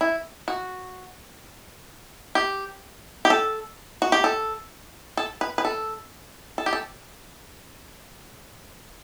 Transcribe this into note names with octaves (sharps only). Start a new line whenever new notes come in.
E4
F#4
G4
G4
A4
F#4
G4
A4
A4
B4
B4
A4
A4
G4
A4